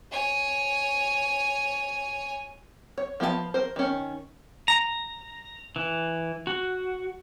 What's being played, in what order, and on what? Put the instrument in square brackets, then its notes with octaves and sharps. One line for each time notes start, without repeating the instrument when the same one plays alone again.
[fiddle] C#5 G#5
[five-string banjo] C#5
F3 B3 F4 G#4 A5
A#4 C5
D#3 C#4
[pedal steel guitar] A#5
E3
F#4